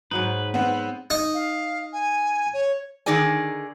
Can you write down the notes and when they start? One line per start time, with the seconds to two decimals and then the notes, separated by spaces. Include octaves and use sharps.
0.11 G#2 F#3 D#4 B4
0.54 B3 C4
1.10 D#4
1.34 F5
1.93 G#5
2.53 C#5
3.06 D3 D#3 D#4 G#4 D5 G#5